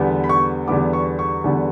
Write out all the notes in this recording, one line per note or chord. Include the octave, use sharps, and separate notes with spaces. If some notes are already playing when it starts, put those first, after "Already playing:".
Already playing: E2 D3 G3 B3
B5
C#6
E2 D3 G3 B3 D6
C#6
C#6
E2 D3 G3 B3